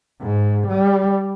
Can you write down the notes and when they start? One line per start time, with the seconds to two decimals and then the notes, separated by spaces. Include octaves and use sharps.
0.21 G#2
0.67 G3